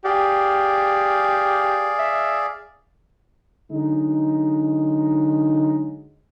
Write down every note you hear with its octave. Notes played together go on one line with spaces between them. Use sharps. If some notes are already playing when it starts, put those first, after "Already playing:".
G4 G#4 D5 F5
E5
D3 F#3 G#3 D#4